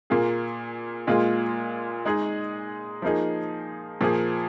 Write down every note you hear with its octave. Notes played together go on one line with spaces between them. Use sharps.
A#2 A#3 F4 G#4
A#2 G#3 F4 G#4
G#3 D#4 G#4
F3 A#3 D#4 G#4
A#2 F3 A#3 G#4